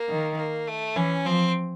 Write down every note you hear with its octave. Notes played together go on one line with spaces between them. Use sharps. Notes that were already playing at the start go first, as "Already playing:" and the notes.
Already playing: A#3
D#3
A#3
A3
E3 C#4
F3 C4